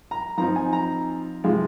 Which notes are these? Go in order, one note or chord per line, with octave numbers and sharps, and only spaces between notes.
A#5
F3 C4 D#4 A#5
G#5
A#5
C3 F3 G#3